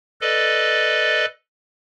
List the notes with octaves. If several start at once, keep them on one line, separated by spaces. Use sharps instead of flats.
A4 B4 D5 D#5